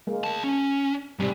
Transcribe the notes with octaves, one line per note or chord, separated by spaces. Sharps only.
G#3 A#3
D2 A5
C#4
G#2 C3 G3